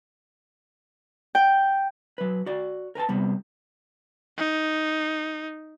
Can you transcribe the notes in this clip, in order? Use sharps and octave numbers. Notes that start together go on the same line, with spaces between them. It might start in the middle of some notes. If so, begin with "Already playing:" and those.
G5
F#3 B4
F#4 D5
A#4 B4 G#5 A5
C3 G3 B3
D#4